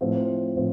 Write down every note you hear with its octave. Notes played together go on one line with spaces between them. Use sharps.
A2 F3 C4 F4
A2 F3 C4